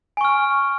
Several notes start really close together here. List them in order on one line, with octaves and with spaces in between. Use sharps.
G#5 C#6 F6